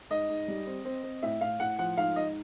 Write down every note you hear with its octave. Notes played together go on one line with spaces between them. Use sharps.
G#2 D#5
G#2
G3
C4
C4
C4
A2 E5
A2 F5
A2 F#5
F3 F#5
G#2 F5
G#2 D#5